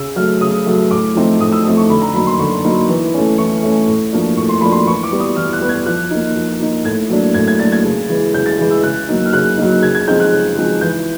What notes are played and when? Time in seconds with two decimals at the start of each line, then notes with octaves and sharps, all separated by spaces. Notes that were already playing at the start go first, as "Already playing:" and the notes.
Already playing: C#3 E6
0.16 F#3 A3 F6
0.41 C#3 D#6
0.66 F#3 A3
0.91 A2 D6
1.15 F3 A3 C4 D#4
1.40 A2 D#6
1.52 E6
1.65 F3 A3 C4 D#4 D#6
1.77 C#6
1.90 D3 B5
2.02 A#5
2.14 F#3 A#3 D#4 B5
2.27 C6
2.39 D3 C#6
2.64 F#3 A#3 D#4
2.88 E3
3.14 A3 C#4
3.38 E3 C#6
3.63 A3 C#4
3.88 A2
4.12 F3 A#3 D4
4.37 A2 C#6
4.49 C6
4.61 F3 A#3 D4 B5
4.72 C6
4.87 E3 C#6
5.03 D6
5.11 G3 B3
5.20 D#6
5.36 E3 F6
5.53 F#6
5.61 G3 B3
5.69 G#6
5.86 F3 F#6
6.11 A#3 D#4
6.36 F3
6.60 A#3 D#4
6.85 A2 G#6
7.09 F#3 A#3 D4
7.34 A2 G#6
7.48 G#6
7.59 F#3 A#3 D4 A6
7.72 G#6
7.84 C#3
8.09 E3 G#3
8.34 C#3 G6
8.46 A6
8.58 E3 G#3
8.71 E6
8.83 C#3 F#6
9.08 F#3 A#3 D#4
9.25 F6
9.33 C#3 F#6
9.58 F#3 A#3 D#4
9.82 C#3 G#6
9.95 G#6
10.08 F3 G#3 C4 D#4 G6
10.20 F#6
10.32 C#3
10.56 F3 G#3 C4 D#4
10.81 E3 G6